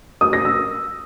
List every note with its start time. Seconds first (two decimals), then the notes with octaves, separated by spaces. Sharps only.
0.21 D#6
0.33 A#6
0.45 E6